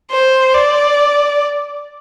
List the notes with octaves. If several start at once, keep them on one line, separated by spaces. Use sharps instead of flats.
C5
D5